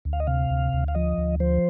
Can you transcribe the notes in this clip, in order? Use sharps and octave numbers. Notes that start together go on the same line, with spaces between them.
D2
F5
D#5
C3 F5
D2
D2
F5
F3 D#5
D2
F3 C5